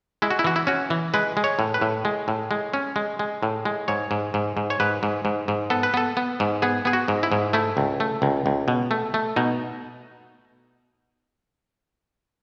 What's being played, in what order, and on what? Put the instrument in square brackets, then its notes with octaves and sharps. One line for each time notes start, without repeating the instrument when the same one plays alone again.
[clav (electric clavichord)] G#3 E4
F#4
E4
E3 F#4
E4
C#4 F#4
E3
G#3 B4
G#3
C#5
A2
B4
A2
G#3
A2
G#3
C#4
G#3
G#3
A2
G#3
G#2 C#5
G#2
G#2
G#2
C#5
G#2 B4
G#2
G#2
G#2
B3 A4
B4
B3 A4
B3
G#2
B3 G#4
B3 G#4
F#4
G#2
E4
G#2
A3 E4
C#2
A3
C#2
C#2
B2
A3
A3
B2 D#4